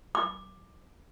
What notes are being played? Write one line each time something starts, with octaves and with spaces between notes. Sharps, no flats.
D6